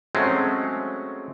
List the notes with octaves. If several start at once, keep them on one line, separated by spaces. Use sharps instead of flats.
F#3 G#3 A3 C4 C#4